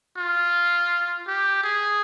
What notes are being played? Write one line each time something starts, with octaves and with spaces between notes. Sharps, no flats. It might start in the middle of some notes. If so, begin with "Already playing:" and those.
F4
G4
G#4